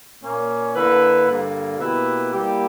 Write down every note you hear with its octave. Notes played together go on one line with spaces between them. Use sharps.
A#2 A#3 C#4
D3 A#3 E4 B4
G2 D3 A#3
B2 A#3 E4 G4 B4
G3 A#3 E4 G4